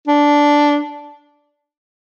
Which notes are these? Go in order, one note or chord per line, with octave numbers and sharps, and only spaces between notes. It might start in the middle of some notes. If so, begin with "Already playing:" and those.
D4